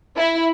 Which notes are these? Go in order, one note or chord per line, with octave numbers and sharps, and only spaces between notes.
E4